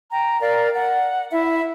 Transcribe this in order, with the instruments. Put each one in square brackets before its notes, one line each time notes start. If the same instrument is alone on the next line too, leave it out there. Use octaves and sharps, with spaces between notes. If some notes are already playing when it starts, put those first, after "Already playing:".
[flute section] G5 A#5
A#4 D5 F5
F#5
E4 E5